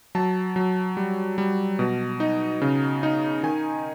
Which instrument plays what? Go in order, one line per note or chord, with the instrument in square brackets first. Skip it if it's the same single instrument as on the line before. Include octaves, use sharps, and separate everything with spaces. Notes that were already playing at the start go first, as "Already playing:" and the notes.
[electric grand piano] F#3 A5
F#3
G3
G3
B2
D#4
C#3
D#4
D#3 G#5